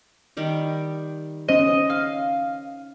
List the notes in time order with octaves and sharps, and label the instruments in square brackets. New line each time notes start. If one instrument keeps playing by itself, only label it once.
[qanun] D#3 G3 G4
[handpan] C#4 C5 [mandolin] D#5
[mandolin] F5